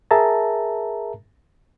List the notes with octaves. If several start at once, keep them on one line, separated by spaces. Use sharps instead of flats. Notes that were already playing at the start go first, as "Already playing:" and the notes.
G#4 A#4 E5 A5 A#5